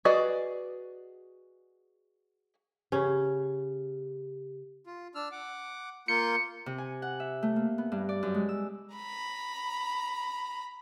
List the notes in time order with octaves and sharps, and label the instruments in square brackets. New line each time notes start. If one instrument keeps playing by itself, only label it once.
[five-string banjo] F#4 G#4 B4 D5 D#5
[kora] C#3 C#4 [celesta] G4
[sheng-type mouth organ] F4
D4 E6 F6
F#5 D6
[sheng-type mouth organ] A#3 F4 G6 [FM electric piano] C#7
[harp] C3
G#5
F#5
E5
A3
A#3
B3
G2
D5
F#2
G#3
E6
[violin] A#5 B5